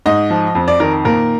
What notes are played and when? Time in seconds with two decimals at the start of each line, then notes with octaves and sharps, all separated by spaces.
0.06 G#2 D#5
0.30 F3
0.55 F2
0.68 D5
0.80 D#3 A#4
1.05 A#2 A#4